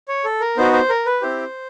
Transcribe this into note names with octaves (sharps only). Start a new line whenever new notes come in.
C#5
A4
A#4
B3 D#4 F#4 C5
C5
A#4
B4
C4 E4 G4 C5